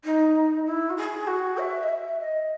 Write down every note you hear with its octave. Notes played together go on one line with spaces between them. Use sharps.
D#4
E4
F#4
G#4
F#4
E5
D#5
E5
D#5